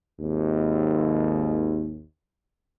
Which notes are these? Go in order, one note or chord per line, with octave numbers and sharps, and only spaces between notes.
G#1 D#2